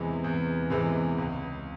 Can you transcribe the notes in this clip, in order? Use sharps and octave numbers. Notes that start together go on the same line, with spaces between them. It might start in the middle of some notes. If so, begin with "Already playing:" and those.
Already playing: E2 C3 E3 G#3 B3
E2
C3 E3 G#3 B3
C#2